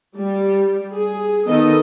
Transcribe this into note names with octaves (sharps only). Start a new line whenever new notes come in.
G3
G#4
D#3 B3 A4 D#5